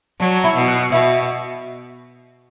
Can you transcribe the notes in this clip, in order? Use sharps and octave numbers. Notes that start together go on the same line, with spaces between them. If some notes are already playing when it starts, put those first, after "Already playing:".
F#3 D4
E4
B2
F#4
B2 E4